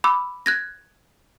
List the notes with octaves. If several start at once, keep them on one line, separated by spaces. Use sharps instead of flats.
B5 D6 E6
F#6 G#6 A#6